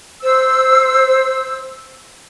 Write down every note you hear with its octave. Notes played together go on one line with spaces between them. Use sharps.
C5 E6